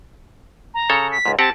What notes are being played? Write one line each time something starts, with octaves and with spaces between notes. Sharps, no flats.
A#5
C#3 A4 C#5
B6
C#2 G#2
C4 G4 F#5 A5